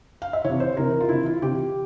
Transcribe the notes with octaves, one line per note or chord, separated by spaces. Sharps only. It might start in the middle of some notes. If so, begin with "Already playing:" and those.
F5
E5
C3 E3 C#5
C5
C3 E3 A#4
F4
C3 E3 E4
F4
C3 E3 G4